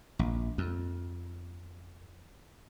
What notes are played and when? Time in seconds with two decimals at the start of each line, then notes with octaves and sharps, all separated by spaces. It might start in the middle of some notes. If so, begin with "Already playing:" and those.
0.19 A#1
0.58 F2